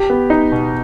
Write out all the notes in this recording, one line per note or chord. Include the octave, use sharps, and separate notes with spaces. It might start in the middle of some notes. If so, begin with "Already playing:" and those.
Already playing: G4
B3
D#4
B2